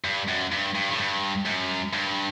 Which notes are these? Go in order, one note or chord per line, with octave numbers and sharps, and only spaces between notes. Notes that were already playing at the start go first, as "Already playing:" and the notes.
G2
F#2
G2
G2
A2
G2
F#2
G2